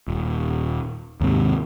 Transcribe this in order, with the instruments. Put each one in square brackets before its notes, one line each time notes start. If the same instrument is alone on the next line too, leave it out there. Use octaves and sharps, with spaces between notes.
[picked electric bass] D#1
D#2 G#2 C3